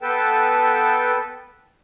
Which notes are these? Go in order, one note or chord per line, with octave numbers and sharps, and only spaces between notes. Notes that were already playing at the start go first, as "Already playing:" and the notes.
B3 A4 B4 G5 A5